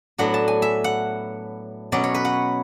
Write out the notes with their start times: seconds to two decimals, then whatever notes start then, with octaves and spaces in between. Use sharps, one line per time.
0.18 A2 F#3 B3 D4 F#5
0.34 A5
0.48 G#5
0.62 E5
0.84 F#5
1.92 B2 F#3 C#4 D5
2.04 C#5
2.15 B4
2.25 F#5